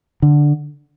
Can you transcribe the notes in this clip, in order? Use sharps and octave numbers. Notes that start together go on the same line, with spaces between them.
D3